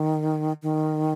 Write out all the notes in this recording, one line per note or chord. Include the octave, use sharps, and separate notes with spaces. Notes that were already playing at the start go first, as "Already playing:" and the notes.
Already playing: D#3
D#3